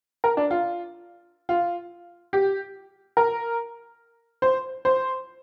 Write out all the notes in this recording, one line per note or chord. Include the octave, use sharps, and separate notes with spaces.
A#4
D4
F4
F4
G4
A#4
C5
C5